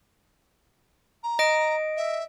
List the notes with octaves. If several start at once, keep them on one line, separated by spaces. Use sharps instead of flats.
A#5
D#5 D7
E5